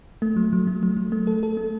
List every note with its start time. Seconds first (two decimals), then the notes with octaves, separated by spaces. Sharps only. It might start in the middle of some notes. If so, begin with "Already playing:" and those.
0.22 A3
0.37 F#3
0.53 F#3
0.67 A3
0.83 F#3
0.97 F#3
1.12 A3
1.27 A4
1.43 A4
1.57 A3